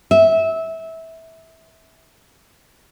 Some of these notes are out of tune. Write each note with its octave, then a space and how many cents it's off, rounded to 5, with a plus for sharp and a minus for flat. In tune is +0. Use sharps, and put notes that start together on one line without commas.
E5 -20